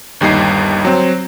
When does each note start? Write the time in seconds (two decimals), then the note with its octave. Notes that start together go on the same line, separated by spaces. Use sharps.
0.21 G1 D#2 G3 D#4 C7
0.85 F#3 C4